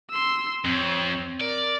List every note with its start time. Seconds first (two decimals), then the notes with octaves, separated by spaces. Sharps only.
0.10 C6 E6
0.65 F2 C4 C#5
1.40 A#4 D5